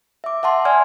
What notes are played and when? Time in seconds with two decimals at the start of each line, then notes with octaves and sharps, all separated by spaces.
0.24 E5 D6
0.43 E5 F#5 A5 C6
0.65 D5 G#5 F6 G#6